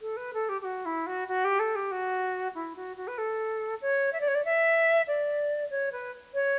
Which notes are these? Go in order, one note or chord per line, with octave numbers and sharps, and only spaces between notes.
A4
B4
A4
G4
G4
F#4
E4
F#4
F#4
G4
A4
G4
F#4
E4
F#4
F#4
B4
A4
C#5
E5
D5
C#5
D5
E5
D5
C#5
B4
C#5